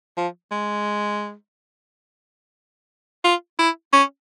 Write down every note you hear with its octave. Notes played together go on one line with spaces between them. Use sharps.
F3
G#3
F4
E4
C#4